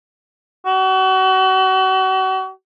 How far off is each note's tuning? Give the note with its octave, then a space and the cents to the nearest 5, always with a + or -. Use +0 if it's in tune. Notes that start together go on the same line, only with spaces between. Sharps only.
F#4 +35